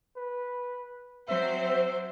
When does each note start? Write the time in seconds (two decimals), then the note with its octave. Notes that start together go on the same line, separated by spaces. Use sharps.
0.17 B4
1.29 F#3 C4 C5 E5